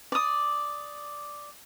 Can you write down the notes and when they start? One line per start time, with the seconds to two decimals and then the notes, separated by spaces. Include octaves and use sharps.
0.12 D5 D#6